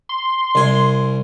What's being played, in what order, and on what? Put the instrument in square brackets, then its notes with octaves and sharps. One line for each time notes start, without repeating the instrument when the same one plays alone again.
[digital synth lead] C6
[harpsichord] C2 G#5